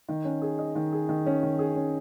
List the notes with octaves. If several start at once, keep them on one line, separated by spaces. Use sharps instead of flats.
D#3
C#4
G#4
D#5
D#3
G#4
D#3
C#4
D#3
G#4
C#4